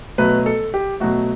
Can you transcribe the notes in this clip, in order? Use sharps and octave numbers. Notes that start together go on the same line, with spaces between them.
B2 F#3 A3 B4
A4
G4
B2 F#3 A3 F#4